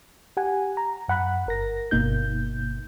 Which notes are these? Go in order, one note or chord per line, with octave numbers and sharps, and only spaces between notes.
G4 F#5 G#5
A#5
F#2 F#5 B5 F#6
G1 A#4 A#6
G1 B2 A#3 D#4 G6